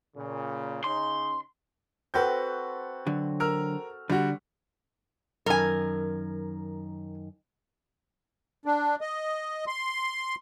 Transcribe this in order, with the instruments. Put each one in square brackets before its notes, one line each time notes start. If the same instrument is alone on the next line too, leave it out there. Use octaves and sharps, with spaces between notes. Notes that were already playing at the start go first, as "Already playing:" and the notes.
[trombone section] A#2 C#3
[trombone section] C#3 C#4 D#4 [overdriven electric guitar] C6
[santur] C4 F#4 A4 [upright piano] B4 G6
[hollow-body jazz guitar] D3 F#3
[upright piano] A#4 E6 F6
[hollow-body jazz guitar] D3 [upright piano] G3 F#4
[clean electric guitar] F#2 D#3 [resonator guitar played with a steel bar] A#4 G#5
[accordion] D4
D#5
C6